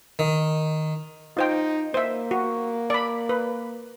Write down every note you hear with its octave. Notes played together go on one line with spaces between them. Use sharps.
D#3
D#4 F4 C5 G5
A#3 C5 E5
F#4
D5 B5
B4